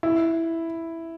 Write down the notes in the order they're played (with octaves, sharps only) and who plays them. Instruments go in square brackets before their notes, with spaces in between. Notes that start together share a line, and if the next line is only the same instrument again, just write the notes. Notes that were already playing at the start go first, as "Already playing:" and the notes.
[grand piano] E4